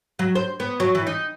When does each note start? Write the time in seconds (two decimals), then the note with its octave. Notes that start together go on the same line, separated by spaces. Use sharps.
0.19 F#3
0.35 C5
0.60 B3
0.80 F#3
0.95 E3
1.07 D#4